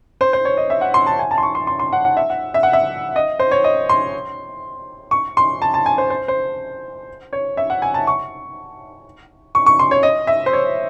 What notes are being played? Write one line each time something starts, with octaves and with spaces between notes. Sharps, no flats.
C5
C5
C#5
D#5
E5
F#5
C6
A5
G#5
A5
C6
C#6
C6
C6
C6
F#5
F#5
E5
F#5
E5
F#5
E5
D#5
C5
C#5
D#5
C6
C#6
C6
A5
A5
G#5
C5
C5
C5
C#5
E5
F#5
G#5
A5
C#6
C#6
C#6
C6
C#5
D#5
E5
C5
C#5